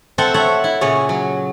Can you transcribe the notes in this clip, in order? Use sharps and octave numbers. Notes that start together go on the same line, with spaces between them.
C4 A4 C5 E5 F#5
A4 C#5 E5 F#5
E4
A#2 C#3 G#4 C#5
F#3